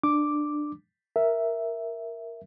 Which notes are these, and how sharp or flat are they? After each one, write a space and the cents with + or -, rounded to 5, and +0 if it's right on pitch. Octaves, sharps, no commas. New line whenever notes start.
D4 +20 D6 +0
A#4 +0 E5 +0